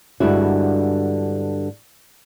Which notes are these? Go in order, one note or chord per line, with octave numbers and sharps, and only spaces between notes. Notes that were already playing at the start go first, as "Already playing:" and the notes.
G2 D3 G#3 E4 F#4